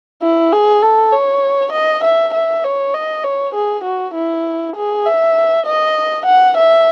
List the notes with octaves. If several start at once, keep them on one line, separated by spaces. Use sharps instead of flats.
E4
G#4
A4
C#5
D#5
E5
E5
C#5
D#5
C#5
G#4
F#4
E4
G#4
E5
D#5
F#5
E5